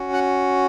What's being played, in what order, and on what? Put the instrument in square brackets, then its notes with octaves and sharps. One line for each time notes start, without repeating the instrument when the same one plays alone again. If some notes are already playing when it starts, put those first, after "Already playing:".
Already playing: [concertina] C#4 F#4
F#5